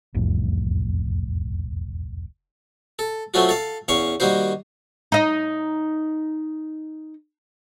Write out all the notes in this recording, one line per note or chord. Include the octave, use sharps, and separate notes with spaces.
E1 C2 F2 A2
A4
F#3 A3 C4 C#4 F4 F#4
A4 F5
E2 C#4 F5 C#6
D#3 G3 A#3 F#4 C5
D#4 D#5